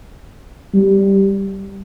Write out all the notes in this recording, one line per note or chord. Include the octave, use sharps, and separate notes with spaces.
G3